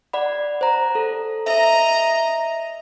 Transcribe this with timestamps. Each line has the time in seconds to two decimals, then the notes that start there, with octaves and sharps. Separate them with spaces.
0.13 D5 F#5 B5
0.61 C5 A#5
0.95 A4
1.46 D#5 E5 A#5